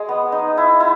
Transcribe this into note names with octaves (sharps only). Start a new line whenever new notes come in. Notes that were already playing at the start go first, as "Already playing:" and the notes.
Already playing: G#3
B3
D#4
E4
E4